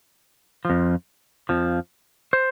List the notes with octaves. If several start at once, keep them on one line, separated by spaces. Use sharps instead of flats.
F2 F3
F2 F3
C5